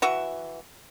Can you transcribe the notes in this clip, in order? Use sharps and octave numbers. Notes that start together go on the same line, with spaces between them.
E3 F#4 E5